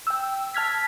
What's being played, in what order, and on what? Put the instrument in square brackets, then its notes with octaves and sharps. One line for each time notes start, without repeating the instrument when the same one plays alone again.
[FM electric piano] G5 E6
A5 F6 G#6 B6